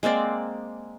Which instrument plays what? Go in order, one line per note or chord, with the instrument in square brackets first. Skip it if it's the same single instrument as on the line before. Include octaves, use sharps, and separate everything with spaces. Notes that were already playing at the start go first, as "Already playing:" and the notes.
[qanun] G#3 A#3 C4 D5